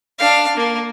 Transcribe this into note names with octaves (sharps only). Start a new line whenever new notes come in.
D4 F5
A#3